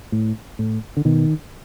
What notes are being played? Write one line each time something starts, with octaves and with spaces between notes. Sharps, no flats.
A2
A2
D3
B2 D#3